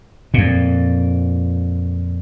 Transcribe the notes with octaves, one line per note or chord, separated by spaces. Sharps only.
F2 A#2